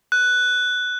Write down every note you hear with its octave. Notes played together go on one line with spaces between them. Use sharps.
F#6